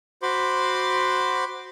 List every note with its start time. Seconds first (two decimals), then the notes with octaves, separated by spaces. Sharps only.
0.22 F#4 C5 B5 C6 D6